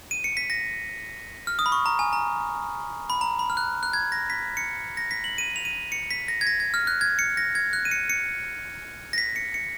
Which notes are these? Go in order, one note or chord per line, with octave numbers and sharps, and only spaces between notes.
D#7
C#7
B6
A#6
F6
D#6
B5
C#6
A#5
G#5
A#5
B5
A#5
B5
F6
F#6
F#6
G#6
A#6
B6
C#7
A#6
B6
F#7
D#7
F7
D#7
C#7
B6
A#6
G#6
A#6
G#6
F6
F#6
G#6
C#7
A#6
G#6
F#6
D#7
C#7
C#7
A#6
B6
C#7
C#7